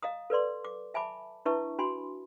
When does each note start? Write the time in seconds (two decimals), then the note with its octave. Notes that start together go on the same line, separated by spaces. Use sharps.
0.03 D#5 F5 A#5 D#6
0.30 A4 B4 D5 C6
0.65 D6
0.94 E5 G#5 A5 B5 D6
1.45 D4 E4 B4 E5 A5 C#6
1.79 D4 F#4 G#5 B5 C6